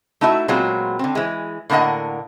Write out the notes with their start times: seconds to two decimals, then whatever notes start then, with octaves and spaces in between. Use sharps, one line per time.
0.21 A3 D#4 E4 F#4 E5
0.48 A#2 F#3 G#3 B3 C4 F4
0.99 D3 C4
1.15 E3 G#3
1.70 A2 D3 A#3 B3 D#5 F#5